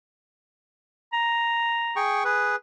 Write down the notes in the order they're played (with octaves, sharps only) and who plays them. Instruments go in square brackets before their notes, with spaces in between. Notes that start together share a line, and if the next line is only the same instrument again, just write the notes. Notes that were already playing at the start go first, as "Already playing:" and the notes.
[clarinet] A#5
[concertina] G#4 G5 C#6
G#4 B4